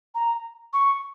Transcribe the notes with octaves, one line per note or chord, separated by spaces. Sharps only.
A#5
C#6